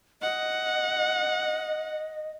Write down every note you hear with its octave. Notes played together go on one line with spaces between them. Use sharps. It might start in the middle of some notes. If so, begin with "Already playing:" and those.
D#5 F#5